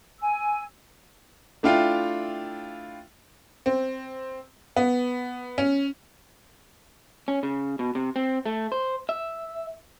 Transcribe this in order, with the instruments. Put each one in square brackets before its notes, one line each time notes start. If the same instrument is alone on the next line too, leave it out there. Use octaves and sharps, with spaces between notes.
[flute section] G#5 E6
[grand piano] A3 D4 E4 F4 F5 G5
[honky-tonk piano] C4
B3
C#4
[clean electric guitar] C#4
C#3
B2
C3
C4
A3
C5
E5